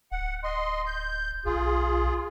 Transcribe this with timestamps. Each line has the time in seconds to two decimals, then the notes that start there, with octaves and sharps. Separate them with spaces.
0.12 D1 F#5
0.44 D#5 C6
0.86 G6
1.45 B1 F4 G#4